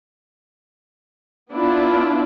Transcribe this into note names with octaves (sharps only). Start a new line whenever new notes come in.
B3 D4 E4 F4